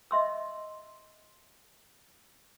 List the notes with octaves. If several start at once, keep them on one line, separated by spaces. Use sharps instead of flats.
D#5 E5 C6 E6